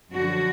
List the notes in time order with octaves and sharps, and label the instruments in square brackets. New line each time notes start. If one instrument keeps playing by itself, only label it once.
[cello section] F#2 D3 F3 F#4